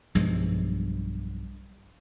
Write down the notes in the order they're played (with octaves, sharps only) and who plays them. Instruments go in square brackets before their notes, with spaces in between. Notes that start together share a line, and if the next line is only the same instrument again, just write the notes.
[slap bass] B1 G2 F3 G#3